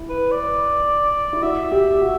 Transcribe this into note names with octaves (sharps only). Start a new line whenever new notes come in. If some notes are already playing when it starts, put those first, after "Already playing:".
Already playing: E4
B4
D5
E4
F#4 E5
G4
F#4